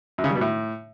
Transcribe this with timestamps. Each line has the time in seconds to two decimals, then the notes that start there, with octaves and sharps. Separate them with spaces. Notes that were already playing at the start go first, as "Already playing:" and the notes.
0.18 F#2
0.24 C#3
0.30 G3
0.35 B2
0.41 A2